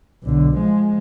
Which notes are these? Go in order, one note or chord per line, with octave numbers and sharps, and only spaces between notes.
B1 D3
F3 G#3